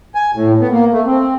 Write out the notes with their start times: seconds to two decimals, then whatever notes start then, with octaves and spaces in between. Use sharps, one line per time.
0.15 G#5
0.34 A2
0.60 B3
0.72 A#3
0.92 A3
1.05 C4